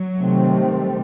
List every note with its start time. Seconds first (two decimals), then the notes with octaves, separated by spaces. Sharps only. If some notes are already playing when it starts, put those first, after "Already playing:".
Already playing: F#3
0.18 C3 D#3 A3 C4
0.66 G3